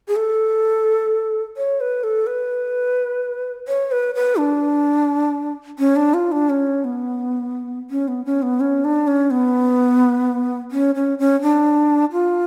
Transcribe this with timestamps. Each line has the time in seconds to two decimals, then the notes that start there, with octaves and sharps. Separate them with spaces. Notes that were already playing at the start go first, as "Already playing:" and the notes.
0.08 G#4
0.16 A4
1.57 C#5
1.81 B4
2.04 A4
2.27 B4
3.68 C#5
3.92 B4
4.15 B4
4.38 D4
5.79 C#4
5.96 D4
6.14 F4
6.32 D4
6.50 C#4
6.85 B3
7.90 C#4
8.08 B3
8.25 C#4
8.42 B3
8.60 C#4
8.85 D4
9.07 C#4
9.31 B3
10.71 C#4
10.95 C#4
11.19 C#4
11.42 D4
12.12 F4